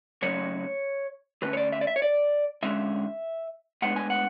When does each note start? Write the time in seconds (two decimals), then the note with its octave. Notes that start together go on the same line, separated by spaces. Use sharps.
0.22 C#3 F#3 A3 C#4 C#5
1.42 D3 A3 C#4 B4
1.53 C#5
1.57 D5
1.72 E5
1.81 D5
1.87 E5
1.96 C#5
2.02 D5
2.63 D3 G#3 C#4 E5
3.82 A2 G#3 B3 D4 F#5
3.96 G#5
4.10 F#5